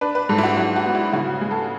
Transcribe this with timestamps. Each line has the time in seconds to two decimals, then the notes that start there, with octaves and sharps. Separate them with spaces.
0.01 D4 B4
0.15 B4
0.29 G#2 A4
0.38 E4
0.43 F#4
0.57 F#3 F#4
0.76 F#4
0.86 B3
0.95 E4
1.13 C#3 F#4
1.41 G#3
1.51 A4